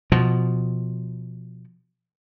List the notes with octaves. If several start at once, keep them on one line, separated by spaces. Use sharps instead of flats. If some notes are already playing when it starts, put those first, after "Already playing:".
B2 F3